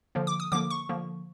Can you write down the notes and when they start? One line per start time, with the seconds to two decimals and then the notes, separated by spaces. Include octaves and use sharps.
0.15 D3 F3 A#3
0.27 D6
0.40 D#6
0.52 D3 F3 A#3 D6
0.70 C#6
0.89 D3 F3 A#3